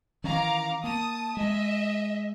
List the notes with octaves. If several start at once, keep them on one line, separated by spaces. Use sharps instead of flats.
D#3 E3 C#4 F5 A#5 D6
A#3 A5 D#6
G#3 D#5 E5